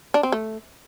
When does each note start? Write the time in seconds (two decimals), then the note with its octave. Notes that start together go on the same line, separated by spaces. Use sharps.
0.14 D4
0.23 C4
0.32 A3